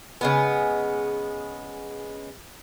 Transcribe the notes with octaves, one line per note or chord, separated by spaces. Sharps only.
C#3 G#3 B3